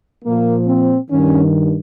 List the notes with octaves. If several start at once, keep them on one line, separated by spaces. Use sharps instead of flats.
A#2 F3 A#3
C4
G2 D#3 C#4